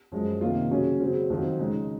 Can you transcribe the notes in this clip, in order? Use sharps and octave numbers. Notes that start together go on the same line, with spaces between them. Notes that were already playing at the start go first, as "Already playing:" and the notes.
F#2 F3 G#3
C3 D#3 A#3 F4
C#3 F#3 C#4
C#3 F#3 C4
F2 D#3 F#3 C4 F4
C#3 G#3 D#4